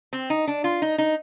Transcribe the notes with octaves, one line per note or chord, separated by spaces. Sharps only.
C4
D#4
D4
F4
D#4
D#4